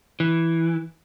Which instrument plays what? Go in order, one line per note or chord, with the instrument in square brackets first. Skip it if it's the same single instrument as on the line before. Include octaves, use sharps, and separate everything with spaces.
[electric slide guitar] E3